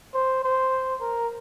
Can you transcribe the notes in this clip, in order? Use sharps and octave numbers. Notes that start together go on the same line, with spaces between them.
C5
C5
A#4